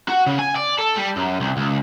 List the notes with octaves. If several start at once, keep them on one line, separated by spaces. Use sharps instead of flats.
F#4
C#3
G#5
D5
A4
G3
F#2
C2
C#2